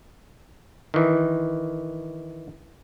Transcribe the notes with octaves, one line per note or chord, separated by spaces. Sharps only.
D#3 E3